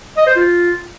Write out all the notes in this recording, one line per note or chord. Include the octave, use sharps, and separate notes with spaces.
D#5
C5
F4